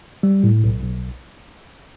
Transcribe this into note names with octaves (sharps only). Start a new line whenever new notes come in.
G3
A2
B1
B1